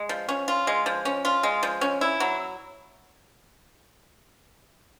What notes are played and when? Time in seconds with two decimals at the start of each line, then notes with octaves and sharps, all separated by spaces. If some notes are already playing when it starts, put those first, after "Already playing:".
Already playing: G#3
0.09 F3
0.29 C#4
0.48 F4
0.67 G#3
0.86 F3
1.05 C#4
1.25 F4
1.43 G#3
1.63 F3
1.81 C#4
2.01 E4
2.20 F#3